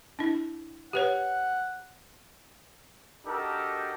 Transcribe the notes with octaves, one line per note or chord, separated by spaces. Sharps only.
D4 E4
G4 B4 C#5 F#5
D4 D#4 F#4 G4 A4 A#4